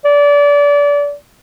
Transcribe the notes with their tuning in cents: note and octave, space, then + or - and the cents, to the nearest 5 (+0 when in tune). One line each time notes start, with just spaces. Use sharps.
D5 -30